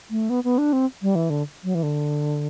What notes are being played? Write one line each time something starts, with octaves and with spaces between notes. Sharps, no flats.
A3
B3
B3
D4
C4
G3
E3
D3
F#3
E3
D3